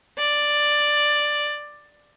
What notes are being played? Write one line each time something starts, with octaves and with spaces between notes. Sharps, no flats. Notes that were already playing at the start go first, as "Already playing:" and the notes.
D5